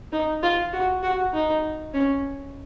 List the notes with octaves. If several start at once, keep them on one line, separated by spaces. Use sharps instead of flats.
D#4
F4
F#4
F#4
D#4
C#4